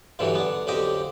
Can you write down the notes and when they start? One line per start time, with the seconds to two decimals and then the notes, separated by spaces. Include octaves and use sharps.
0.19 E2 G2 B2 D3 E3 F#3
0.35 D3 B3
0.67 B1 F2 D3 G4 D#5